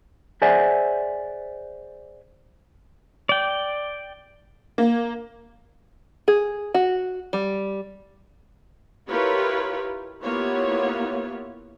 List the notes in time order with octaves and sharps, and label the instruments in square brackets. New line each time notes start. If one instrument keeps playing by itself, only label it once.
[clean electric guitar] G#4 C5 D5 E5 F#5 G#5
[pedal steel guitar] D5 G5
[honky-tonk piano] A#3
[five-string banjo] G#4
F#4
G3
[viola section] E4 F4 G4 A#4 B4 C#5
A#3 B3 E4 F4 G4 C#5